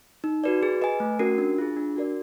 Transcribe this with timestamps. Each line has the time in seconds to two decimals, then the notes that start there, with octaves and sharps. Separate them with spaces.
0.24 D#4
0.44 F#4 B4 D5
0.63 G#4
0.82 B4 D#5 G#5
1.00 A3
1.19 C#4 F#4 A#4
1.38 D4
1.58 F4 G#4
1.76 D4
1.96 F#4 A#4 D5